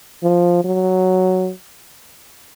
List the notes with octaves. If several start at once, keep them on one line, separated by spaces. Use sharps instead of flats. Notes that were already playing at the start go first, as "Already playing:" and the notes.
F3
F#3